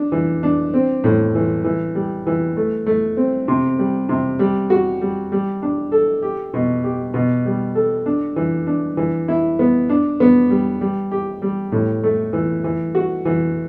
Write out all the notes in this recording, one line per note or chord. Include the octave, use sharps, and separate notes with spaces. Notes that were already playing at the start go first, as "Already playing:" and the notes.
Already playing: D4
E3
D4
C4
A2
E3
E3
G3
E3
A3
A3
C4
C3
G3
C3
G3
F#4
G3
G3
D4
A4
G4
B2
G4
B2
G3
A4
D4
E3
D4
E3
E4
B3
D4
B3
G3
G3
G4
G3
A2
A3
E3
E3
F#4
E3